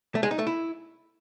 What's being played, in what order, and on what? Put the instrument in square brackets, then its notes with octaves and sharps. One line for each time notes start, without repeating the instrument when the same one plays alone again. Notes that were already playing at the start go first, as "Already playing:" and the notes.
[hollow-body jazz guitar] A3
G#3
D#4
A3
E4